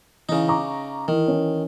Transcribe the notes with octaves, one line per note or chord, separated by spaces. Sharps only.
C#3 E3 D#4
A#5 C#6 D6
D#3 E3
E3 C#4